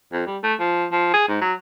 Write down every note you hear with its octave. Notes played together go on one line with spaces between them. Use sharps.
F2
G3
A3
F3
F3
G#4
G#2
F#3